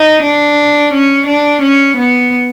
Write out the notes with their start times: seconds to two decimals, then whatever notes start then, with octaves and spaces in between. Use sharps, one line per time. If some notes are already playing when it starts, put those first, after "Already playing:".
Already playing: D#4
0.23 D4
0.93 C#4
1.27 D4
1.62 C#4
1.97 B3